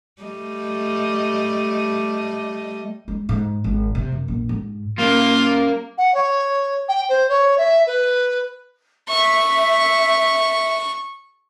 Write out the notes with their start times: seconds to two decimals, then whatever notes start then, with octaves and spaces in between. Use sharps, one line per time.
0.22 G3 A3 D#5
3.08 G#3
3.29 G#2
3.64 G#1
3.95 C3
4.12 F#2
4.28 A#1
4.49 G#2
4.98 G3 A#3 C#4 F4
5.98 F#5
6.14 C#5
6.88 G5
7.09 C5
7.29 C#5
7.58 E5
7.87 B4
9.09 E5 C#6